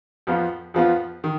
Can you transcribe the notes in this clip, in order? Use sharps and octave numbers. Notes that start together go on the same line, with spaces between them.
F2 F3 B3 F4
F2 F3 B3 F4
D#3